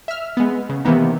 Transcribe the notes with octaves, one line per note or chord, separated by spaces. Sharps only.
E5 F6
G#3 B3
C#3
C3 D#3 E3 A#3 B3 D#4